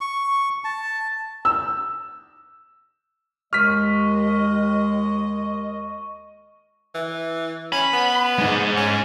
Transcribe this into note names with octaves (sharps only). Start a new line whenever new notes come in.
C#6
A5
E6
D#2 G#3 D#5 C#6 F6 B6
E3
C#4 B5
B3
G#3 D#4
C#4